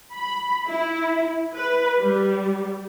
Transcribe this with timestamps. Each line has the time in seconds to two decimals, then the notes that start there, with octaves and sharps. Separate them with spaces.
0.16 B5
0.68 E4
1.55 B4
2.00 G3